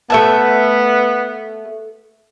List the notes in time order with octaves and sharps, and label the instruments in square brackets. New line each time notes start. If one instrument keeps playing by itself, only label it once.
[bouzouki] A3 E5 A5 [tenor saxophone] B3